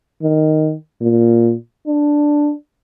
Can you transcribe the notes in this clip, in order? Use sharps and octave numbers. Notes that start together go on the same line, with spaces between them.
D#3
A#2
D4